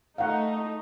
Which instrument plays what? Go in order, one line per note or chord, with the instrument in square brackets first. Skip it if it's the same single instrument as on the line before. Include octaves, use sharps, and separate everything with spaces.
[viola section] A3 D#4 [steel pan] F5 F#5